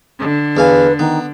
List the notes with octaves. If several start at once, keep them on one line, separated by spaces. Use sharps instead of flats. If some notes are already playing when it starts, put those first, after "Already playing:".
D3
E2 B4 F5 G#5
D#3 B3